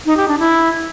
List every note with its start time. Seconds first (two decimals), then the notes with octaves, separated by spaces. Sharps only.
0.06 D#4
0.17 G4
0.28 D4
0.39 E4